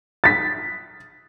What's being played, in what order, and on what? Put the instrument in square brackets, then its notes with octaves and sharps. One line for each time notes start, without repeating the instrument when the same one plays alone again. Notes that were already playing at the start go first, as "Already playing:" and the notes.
[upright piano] A6 B6